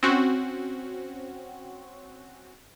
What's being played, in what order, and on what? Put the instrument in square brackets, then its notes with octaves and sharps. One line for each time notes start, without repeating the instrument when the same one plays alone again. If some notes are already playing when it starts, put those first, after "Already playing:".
[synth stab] C4 C#4 F#4